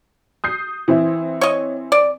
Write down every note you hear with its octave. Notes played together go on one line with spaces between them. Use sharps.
D#6 G6 C7
E3 C4 E4
C#5 D#5
D5